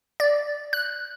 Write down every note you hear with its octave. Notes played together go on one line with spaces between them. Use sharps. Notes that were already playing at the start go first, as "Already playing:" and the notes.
D5
F#6